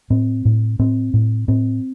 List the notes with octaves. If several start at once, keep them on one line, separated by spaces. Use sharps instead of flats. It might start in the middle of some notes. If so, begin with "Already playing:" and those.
A2 C4
A2
A2 C4
A2
A2 C4